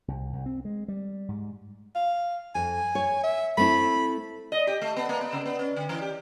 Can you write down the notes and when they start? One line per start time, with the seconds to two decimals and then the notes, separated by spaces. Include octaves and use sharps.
0.08 C2
0.33 C2
0.46 C4
0.65 G#3
0.88 G3
1.29 G#2
1.95 F5
2.55 F2 G#5
2.95 C#5
3.23 E5
3.57 A3 C4 E4 B5
4.52 D#5
4.67 G4
4.81 A3
4.96 B3
5.09 A#3
5.21 B3
5.33 C#3
5.46 B3
5.59 C#4
5.76 D3
5.89 E3
6.01 G4